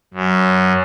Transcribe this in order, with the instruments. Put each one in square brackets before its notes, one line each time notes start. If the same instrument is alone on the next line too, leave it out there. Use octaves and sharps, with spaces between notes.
[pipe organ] F#2